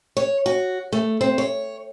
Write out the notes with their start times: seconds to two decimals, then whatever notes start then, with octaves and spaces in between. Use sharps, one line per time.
0.17 C#5
0.46 F#4
0.92 A3
1.21 C4
1.38 C#5